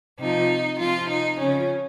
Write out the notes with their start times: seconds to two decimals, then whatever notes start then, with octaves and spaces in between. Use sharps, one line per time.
0.19 C3 F3 D#4
0.79 C3 F3 F4
1.09 D#4
1.39 C#3 F3 C#4